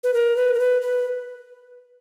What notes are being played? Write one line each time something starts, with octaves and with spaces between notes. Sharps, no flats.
B4
A#4
B4
A#4
B4
B4